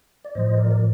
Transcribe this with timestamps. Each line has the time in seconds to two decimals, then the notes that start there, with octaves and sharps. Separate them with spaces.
0.25 D5
0.35 A2 F3 C5 D#5
0.58 A#4 D5
0.71 D5